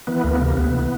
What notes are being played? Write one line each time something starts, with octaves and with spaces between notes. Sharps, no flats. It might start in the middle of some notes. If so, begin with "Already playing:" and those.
E3 B3
D2 A#3
B3
C3 A#3
D2 B3
E3